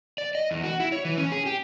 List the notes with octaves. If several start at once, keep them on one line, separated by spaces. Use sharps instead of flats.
D5
D#5
E2
F#4
E4
C#5
E3
C#4
G#4
G4